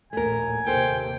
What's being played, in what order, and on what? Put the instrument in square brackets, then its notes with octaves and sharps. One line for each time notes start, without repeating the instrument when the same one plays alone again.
[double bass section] A#1 D#2 A2 [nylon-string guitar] A3 A#4 [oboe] G#5
[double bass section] D#2 C3 [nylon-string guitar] A4 A#4 C5 [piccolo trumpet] G5